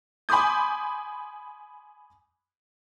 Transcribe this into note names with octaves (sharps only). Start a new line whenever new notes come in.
G#5 B5 C6 D6 D#6 G6